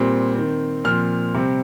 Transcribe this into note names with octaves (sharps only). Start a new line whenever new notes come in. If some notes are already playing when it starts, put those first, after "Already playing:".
Already playing: A#2 G3 C4
D#3 C4
A#2 F3 C4 F6
C3 G3 C4